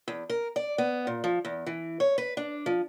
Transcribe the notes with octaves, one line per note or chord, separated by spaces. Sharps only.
E2
A#4
D5
B3
A#2
F3
E2
E3
C#5
B4
D4
F3